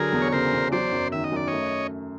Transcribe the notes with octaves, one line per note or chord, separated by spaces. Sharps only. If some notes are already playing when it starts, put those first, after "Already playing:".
Already playing: D3 F#3 G#4 A#4
E2
C#5
C#3 A#4 C5
E2
F#3 C5 D5
F#2
D#3 E5
D#5
F#2 D5
A3 C#5 D#5